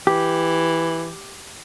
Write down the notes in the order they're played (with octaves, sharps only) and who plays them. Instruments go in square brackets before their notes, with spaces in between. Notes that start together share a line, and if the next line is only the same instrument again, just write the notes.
[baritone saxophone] E3 [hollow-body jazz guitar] G4